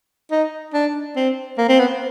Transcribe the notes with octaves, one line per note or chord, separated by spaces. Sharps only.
D#4
D4
C4
A#3
C4
B3